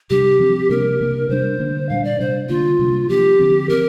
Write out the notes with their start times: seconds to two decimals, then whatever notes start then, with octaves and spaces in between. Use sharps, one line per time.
0.10 C3 G3 D4 G4
0.40 F3 C4
0.70 C3 G3 A#3 D4 A#4
1.01 C3 A#3 D4
1.29 C3 G3 D4 C5
1.60 D3 A#3 D4
1.89 A#2 G3 D4 F5
2.04 D5
2.20 C3 G3 D4 C5
2.49 D3 A#3 D4 F4
2.79 C3 G3 A#3
3.09 F3 A#3 D4 G4
3.40 D3 F3 C4
3.69 F3 C4 A#4